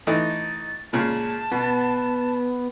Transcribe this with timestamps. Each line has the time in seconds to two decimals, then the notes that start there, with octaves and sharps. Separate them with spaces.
0.07 E3 A3 D#4 A6
0.93 A#2 C#3 G#3 A5
1.52 B2 B3